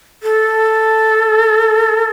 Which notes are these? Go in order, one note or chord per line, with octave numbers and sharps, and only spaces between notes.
A4